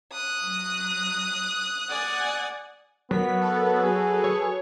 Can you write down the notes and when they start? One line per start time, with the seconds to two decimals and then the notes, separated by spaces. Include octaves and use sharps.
0.12 D#6 F#6
0.44 F#3
1.89 D5 F#5 G#5
3.11 F#3 B3 A#4 B6
3.41 A4 B4
3.83 F#4 G#4
4.24 C#5